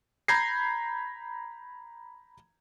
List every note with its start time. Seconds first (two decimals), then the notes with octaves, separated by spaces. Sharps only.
0.28 A#5 B5 G6 G#6 A#6 C7